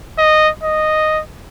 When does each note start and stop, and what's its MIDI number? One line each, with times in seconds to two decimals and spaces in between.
0.18 0.50 75
0.63 1.21 75